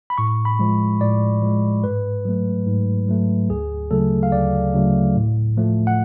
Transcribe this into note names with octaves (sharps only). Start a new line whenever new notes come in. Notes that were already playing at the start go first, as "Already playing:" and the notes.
B5
A2 C#6
B5
F3 G#3
A2 D5
F3 G#3
G#2 B4
F#3 A3
G#2
F#3 A3
D2 G#4
C#3 F#3 A3 A4
F5
D2 D5
C#3 F#3 A3
A2
F3 A3
F#5